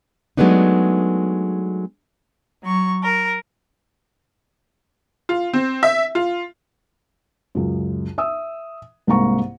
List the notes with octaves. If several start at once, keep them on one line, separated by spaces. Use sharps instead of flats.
F#3 G#3 A3 B3 D4 D#4
F#3 C#6
A#4
F4
C4
E5
F4
C#2 F#2
E5 D#6 E6
C2 G#2 A#3 A#5 C#6